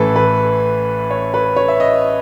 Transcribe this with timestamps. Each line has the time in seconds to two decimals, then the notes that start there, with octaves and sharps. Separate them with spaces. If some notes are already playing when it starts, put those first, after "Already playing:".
Already playing: A1 A2 E3 A4 B4
0.16 B4
1.11 C#5
1.34 B4
1.56 C#5
1.68 E5
1.80 D#5